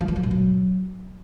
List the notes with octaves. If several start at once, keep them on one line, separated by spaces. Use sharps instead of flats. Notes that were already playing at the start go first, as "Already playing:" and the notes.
F3
E3
F#3
A#2
F#3